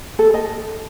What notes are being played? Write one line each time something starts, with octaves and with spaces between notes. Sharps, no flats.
A4
D#5 A5